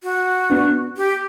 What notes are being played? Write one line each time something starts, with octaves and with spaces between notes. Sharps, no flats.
F#4
B3 D4
G4